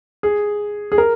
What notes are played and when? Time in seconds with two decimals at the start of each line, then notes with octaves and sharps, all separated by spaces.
0.23 G#4
0.92 G#4
0.98 A#4